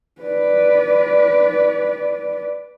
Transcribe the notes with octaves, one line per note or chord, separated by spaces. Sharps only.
B4 D5